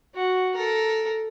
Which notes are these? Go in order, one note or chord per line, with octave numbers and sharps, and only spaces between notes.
F#4
A4 A#4